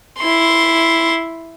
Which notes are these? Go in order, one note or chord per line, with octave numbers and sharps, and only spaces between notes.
E4 C6